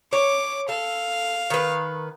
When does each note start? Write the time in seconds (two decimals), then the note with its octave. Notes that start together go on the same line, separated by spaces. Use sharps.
0.13 C#5 D6
0.69 A4 F5
1.50 D#3 B4